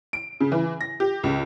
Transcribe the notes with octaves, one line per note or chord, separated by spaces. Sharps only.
D7
C#3
E3
A#6
G4
C#2